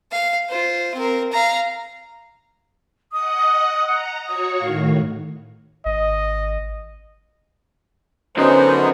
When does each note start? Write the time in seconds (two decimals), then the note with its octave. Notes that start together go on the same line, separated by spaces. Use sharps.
0.11 F5
0.49 F4 C5
0.94 C4 A#4
1.32 F5 A#5
3.12 D#5 F#5 D#6
3.87 F#5 A#5
4.26 F#4 C#5 C#6 D#6
4.60 A2 D#3 F5
5.86 G#1 D#5
8.37 F#2 D3 F#3 B3 C#4 D#4 C5 D#5